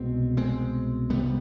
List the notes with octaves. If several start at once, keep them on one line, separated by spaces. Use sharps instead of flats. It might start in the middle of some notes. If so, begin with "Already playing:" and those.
Already playing: C2 B2 G#3 C4
G#3 C4
C2 C3 G3 B3